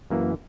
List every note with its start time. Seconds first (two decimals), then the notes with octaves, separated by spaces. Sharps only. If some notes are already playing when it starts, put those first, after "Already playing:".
0.10 F#2 E3 A#3